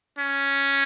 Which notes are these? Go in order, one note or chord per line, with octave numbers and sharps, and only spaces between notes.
C#4